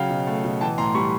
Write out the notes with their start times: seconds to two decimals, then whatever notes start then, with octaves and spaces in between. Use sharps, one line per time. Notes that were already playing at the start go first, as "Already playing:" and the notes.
Already playing: C#3 F#3 F5 G5
0.10 B2
0.27 A3
0.44 B2
0.61 E3 G5 A5
0.78 A2 A#5 C6
0.94 G3 B5 C#6